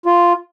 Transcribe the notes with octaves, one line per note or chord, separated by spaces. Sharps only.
F4